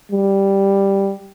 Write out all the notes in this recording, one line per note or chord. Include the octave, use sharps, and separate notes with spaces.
G3